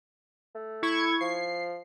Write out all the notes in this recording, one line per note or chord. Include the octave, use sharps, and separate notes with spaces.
A3
E4 C#6 G#6
F3 C7